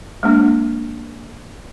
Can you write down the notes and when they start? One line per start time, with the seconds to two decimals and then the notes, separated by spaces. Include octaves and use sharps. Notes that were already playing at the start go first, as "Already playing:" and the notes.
0.23 G#3 A#3 D4